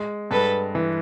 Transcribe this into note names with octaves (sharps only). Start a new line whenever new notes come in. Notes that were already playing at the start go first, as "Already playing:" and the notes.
Already playing: G#3
G2 A4 B4
E3